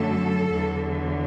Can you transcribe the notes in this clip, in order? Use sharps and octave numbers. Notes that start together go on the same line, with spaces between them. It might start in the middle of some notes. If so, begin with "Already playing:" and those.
Already playing: F#2 D3 F#3 A3 A4
E2 D3 F#3